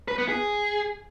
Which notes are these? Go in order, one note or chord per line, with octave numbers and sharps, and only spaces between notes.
B4
B3
G#4